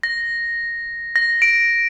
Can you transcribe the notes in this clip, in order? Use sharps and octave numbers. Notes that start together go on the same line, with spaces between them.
A#6
A#6
D7